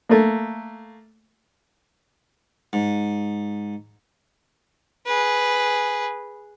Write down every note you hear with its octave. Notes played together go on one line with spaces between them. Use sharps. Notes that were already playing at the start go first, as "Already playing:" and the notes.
A3 A#3
G#2
G#4 B4